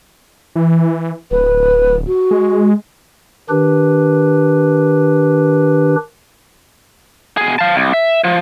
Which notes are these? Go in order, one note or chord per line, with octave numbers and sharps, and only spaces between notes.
E3
D1 B4
F#4
G#3
D#3 D4 G4 B4
B2 G#4
F5 A5
C2
E5
F3